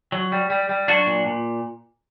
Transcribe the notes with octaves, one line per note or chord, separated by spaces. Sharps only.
F#3
G3
G3
G3
F#3 D4 F#4
A#2
A#2